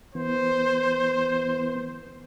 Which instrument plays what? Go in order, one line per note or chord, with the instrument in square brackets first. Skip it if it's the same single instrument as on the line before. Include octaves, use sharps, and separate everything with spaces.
[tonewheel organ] E3 B3 [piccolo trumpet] C5